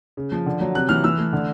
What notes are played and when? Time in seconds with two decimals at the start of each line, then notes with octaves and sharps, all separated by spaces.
0.17 C#3
0.32 F3
0.46 D3
0.61 F#3
0.75 C3 F#6
0.89 E3 F6
1.04 E3 E6
1.18 A3
1.33 D3